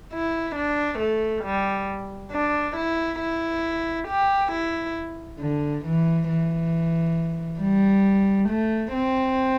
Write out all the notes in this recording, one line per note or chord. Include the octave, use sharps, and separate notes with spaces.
E4
D4
A3
G3
D4
E4
E4
G4
E4
D3
E3
E3
G3
A3
C4